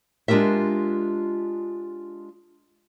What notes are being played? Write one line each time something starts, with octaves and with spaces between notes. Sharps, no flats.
G#3 D4 F4 G4 A#4 E5